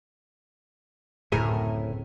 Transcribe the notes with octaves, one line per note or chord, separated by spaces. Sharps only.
D1 F#2 A2 C#3 E4 G#4 A#4